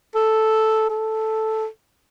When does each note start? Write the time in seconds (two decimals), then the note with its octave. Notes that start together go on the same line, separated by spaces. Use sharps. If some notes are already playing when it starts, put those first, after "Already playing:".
0.15 A4
0.90 A4